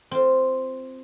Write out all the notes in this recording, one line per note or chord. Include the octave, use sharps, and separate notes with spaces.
C4 F4